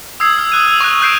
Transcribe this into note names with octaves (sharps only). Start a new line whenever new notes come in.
D#6 E6 G#6 C7
F6 F#7
D#6 F#6 D#7
E6 F7
C#6 F#6
E6 F#6 G6 C7 D7 E7